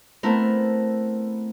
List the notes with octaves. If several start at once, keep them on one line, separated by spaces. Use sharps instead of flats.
A3 B3 C4 E4 A4 A#4